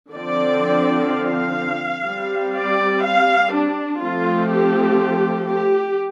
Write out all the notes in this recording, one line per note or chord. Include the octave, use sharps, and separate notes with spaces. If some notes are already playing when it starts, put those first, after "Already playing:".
D3 F3 C4 D5
F5
G3 C4
D5
F5
D4
F3 A3 C4 F4
G4
G4